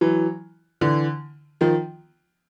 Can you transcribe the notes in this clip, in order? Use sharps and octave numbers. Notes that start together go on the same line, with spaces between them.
E3 F#3
D3 E3
D#3 F3